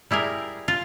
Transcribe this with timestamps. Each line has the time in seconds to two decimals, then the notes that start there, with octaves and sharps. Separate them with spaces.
0.11 G3 E4 G#4 A#4
0.68 F4